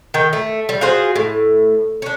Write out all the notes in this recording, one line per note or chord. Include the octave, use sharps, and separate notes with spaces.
D#3 G5
A3
G3
F4 F#4 G#4 C5
A2
C#4 D4